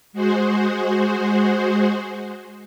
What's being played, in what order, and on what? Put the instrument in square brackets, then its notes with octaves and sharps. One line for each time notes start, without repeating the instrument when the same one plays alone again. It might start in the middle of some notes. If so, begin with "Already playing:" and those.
[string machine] G#3 F#4 G#4 C5